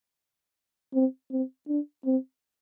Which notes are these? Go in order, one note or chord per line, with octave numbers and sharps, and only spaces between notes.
C4
C4
D4
C4